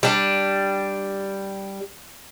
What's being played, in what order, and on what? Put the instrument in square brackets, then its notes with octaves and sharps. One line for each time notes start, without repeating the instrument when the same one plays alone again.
[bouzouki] G3 D4